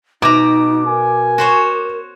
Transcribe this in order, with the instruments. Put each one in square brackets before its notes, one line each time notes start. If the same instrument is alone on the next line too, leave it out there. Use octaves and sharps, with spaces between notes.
[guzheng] B2 A#5 [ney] D#4 [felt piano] D6
[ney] A#4 [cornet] G#5
[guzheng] F#4 C5 C#5